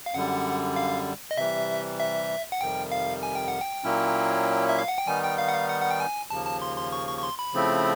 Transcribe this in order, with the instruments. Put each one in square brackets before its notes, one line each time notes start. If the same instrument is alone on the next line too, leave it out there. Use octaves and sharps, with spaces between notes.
[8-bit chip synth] F5
[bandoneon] F#2 D3 G3 [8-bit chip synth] F#5
[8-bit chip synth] F5
D#5
[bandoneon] C3 E3 G3 [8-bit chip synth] E5
[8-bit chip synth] E5
F#5
[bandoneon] F2 C3 D#3 G3 [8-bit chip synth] G5
[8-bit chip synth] F5
G#5
G5
F#5
G5
[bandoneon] A#2 F#3 A#3 C#4 E4
[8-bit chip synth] E5
F5
F#5
G5
[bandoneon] D#3 G3 B3 D#4 [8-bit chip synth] G#5
[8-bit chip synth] G5
F5
F#5
F5
F#5
F#5
G5
G#5
[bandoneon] D#2 C#3 F3 A#3 [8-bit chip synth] A5
[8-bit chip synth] A5
C6
C6
C#6
C#6
C#6
C6
B5
[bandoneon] C#3 F3 A3 C4 E4